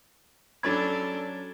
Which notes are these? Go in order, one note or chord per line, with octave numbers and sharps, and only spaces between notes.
F#3 C#4 D4 A4 B5 G#6 A6